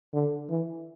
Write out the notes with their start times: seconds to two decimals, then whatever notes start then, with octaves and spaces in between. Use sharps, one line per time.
0.13 D3
0.50 E3